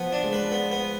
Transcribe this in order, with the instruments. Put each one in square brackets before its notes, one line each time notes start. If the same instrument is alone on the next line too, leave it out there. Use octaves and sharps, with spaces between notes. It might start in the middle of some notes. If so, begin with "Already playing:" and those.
Already playing: [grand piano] F3 [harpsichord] B3
[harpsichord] D4
[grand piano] G#3
[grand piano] F3 [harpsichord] B4
[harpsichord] B3
B3